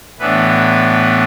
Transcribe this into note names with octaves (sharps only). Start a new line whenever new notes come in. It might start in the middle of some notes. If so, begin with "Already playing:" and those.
A2 E3 B3 D4 B4